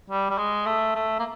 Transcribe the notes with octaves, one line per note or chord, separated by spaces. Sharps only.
G3
G3
G#3
A3
A3
A#3